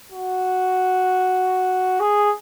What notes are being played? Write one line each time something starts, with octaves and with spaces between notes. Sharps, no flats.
F#4
G#4